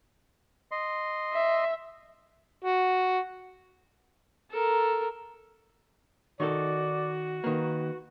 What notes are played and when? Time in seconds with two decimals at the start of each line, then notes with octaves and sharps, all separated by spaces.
0.72 D#5 C6
1.32 E5
2.65 F#4
4.51 A4 A#4
6.40 D#3 D#4 F#4 A4 D5
7.44 D#3 A#3 B4